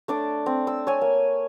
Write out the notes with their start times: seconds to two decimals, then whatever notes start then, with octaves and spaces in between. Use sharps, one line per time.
0.08 A3 D4 D5
0.46 C4
0.67 E6
0.87 C#5 G#5
1.01 A#3